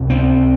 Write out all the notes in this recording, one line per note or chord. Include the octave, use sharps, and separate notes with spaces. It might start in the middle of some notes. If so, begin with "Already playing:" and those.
Already playing: C#2 C3
C4